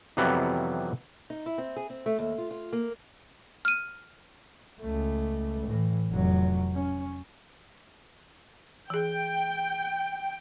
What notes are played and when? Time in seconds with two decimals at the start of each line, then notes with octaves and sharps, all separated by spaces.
0.17 F2 C3 E3 F#3 G3 B3
1.30 D#4
1.46 E4
1.58 C4
1.76 G#4
1.90 C4
2.06 A3
2.19 D#2
2.38 F4
2.51 F4
2.73 A#3
3.65 F6 D#7
4.82 C#2 A3
5.66 A2 E3
6.11 F1 F#3
6.74 C#4
8.90 E3 G#4 G5